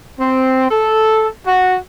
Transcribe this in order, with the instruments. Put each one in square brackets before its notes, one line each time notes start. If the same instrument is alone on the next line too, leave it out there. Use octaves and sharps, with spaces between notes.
[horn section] C4
A4
F#4